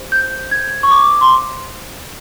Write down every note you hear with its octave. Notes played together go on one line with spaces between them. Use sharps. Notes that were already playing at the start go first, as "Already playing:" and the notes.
Already playing: G4 C5
G6
G#6
C#6
D6
C6